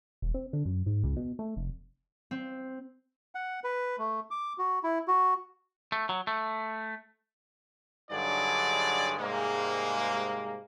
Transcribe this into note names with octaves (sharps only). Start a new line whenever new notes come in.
E1
C4
D3
F#2
G#2
C#2
B2
A3
F1
C4
F#5
B4
A3
D6
F#4
E4
F#4
A3
F#3
A3
G2 D3 F#3 D#4 G#4 D5
G#2 C3 G3 G#3 A#3